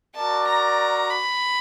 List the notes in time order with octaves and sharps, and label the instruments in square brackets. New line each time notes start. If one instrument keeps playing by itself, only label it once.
[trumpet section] F#4 A#4 D5 [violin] A5
[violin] A#5
B5